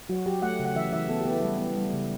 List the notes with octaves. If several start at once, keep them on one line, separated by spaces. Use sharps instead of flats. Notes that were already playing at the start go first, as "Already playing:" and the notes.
F#3 F#4
F#3 G4
A3 F#5
C#3
F#5
E3 E5
E3 E5
B3 A4
B3 G4
E4
G3
B3
G3
C#3